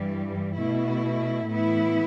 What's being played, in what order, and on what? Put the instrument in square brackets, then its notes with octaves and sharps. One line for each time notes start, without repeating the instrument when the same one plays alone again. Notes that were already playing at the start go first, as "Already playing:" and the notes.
Already playing: [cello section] G2 E3 G3
B2 A3 E4
A2 E3 B3 E4